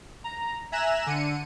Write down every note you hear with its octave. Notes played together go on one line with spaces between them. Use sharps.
A#5
E5 G#5 A#5 F#6 E7
D3 C#7 D#7